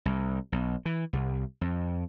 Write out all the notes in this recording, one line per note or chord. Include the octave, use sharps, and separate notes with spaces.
C2
B1
E3
C2
F2